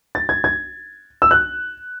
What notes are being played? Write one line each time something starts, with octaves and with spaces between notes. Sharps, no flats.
A6
G#6
G#6
E6
F#6